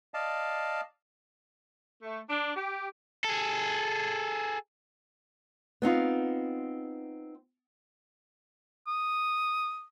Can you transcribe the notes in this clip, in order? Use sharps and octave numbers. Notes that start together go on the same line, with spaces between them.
D5 D#5 F5 A5
A3
D4
G4
G#4 A4
B3 C4 D#4 F4
D#6